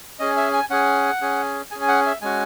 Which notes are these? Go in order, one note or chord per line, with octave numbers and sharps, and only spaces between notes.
C#4 G#4 D#5
E5
G#5
C#4 G#4 F#5
C#4 G#4
C#4 G#4 G#5
G#5
F#5
E5
G#3 C#4 F#4 G#5